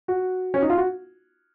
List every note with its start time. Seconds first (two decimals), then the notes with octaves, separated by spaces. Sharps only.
0.08 F#4
0.54 C#4
0.62 D#4
0.70 F4
0.78 F#4